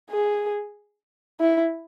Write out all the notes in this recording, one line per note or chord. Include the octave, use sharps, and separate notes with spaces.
G#4
E4